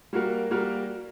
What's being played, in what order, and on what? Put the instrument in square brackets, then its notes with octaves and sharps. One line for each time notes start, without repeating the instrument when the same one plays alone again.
[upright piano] G3 A#3 F#4 A#4
G3 A#3 F#4 A#4